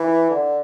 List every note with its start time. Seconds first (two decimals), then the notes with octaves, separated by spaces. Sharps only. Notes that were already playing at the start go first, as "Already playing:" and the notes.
Already playing: E3
0.30 D3